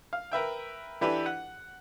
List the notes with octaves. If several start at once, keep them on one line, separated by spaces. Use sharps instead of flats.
F5
A#4 B4 E5 G5
E3 D4 E4 G4 A4 B4
F#5